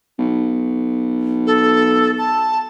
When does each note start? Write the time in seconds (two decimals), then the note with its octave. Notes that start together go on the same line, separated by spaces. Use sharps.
0.19 B1
1.46 A4
2.18 A5